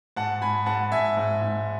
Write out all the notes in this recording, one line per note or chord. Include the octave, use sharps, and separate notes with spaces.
G#2 F#5 A5
G#2 G#5 B5
G#2 F#5 A5
G#2 E5 G#5
G#2
G#2